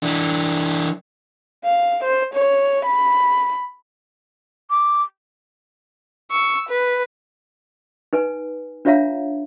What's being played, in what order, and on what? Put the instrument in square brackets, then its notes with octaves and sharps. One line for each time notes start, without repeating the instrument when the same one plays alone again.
[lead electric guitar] E3 D4
[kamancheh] F5
C5
C#5
B5
[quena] D6
[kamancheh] C#6 E6
B4
[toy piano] D#4 B4 G#5
D4 F4 C#5 E5 F5 A#5